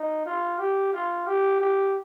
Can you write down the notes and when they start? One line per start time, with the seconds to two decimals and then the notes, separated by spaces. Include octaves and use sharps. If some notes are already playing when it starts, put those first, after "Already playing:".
Already playing: D#4
0.26 F4
0.59 G4
0.93 F4
1.27 G4
1.60 G4